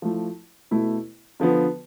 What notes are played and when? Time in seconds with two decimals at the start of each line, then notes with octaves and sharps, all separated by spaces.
0.02 F3 A3 E4
0.71 B2 A3 E4
1.40 D3 F3 B3